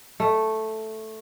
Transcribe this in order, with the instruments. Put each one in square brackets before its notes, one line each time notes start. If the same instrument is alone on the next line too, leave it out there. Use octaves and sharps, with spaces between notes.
[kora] A3